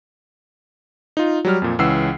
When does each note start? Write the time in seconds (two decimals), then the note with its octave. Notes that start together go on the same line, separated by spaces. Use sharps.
1.17 D#4 F4
1.45 F#3 G3 F6
1.62 F2 A#2
1.79 C#2 E3 C#4 F#5 E6 C7